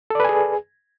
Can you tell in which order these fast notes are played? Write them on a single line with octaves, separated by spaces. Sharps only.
A4 D5 B4 G#5 G#4